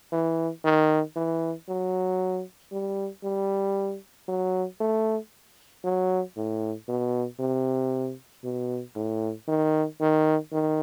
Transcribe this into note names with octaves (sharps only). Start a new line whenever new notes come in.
E3
D#3
E3
F#3
G3
G3
F#3
A3
F#3
A2
B2
C3
B2
A2
D#3
D#3
D#3